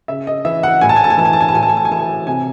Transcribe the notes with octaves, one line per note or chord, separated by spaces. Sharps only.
C#3 E5
D#5
E3 E5
F#5
A2 G#5
A5
G#5
A5
G#5
E3 A5
G#5
A5
G#5
A5
A2 G#5
A5
G#5
A5
G#5
E3 A5
G#5
C3 G#5